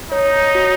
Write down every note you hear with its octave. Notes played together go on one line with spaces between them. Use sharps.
D#4 C#5
F#4